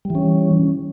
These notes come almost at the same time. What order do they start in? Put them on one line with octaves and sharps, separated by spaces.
G3 E3 C#4